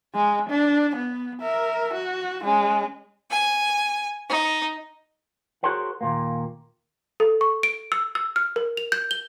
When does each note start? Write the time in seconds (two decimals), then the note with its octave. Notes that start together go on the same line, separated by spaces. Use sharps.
0.15 G#3
0.50 D4
0.95 B3
1.42 A#4 E5
1.94 F#4
2.44 G#3 C#4
3.30 G#5
4.29 D#4
5.63 F#4 G#4 A#4 C5 C#5 F#5
6.01 D#2 A#2 A#3
7.20 A4
7.41 C#6
7.63 D7
7.92 E6
8.15 E6
8.36 F6
8.56 A#4
8.77 F7
8.92 G6
9.11 G7